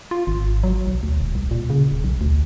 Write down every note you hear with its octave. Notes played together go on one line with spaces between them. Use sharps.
F4
G#1
F#3
B1
D2
D#1
C2
A#2
C#3
D#1
B1
D2